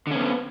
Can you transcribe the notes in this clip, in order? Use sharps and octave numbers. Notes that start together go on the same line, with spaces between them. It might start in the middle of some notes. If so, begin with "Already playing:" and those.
D3 B3 C#4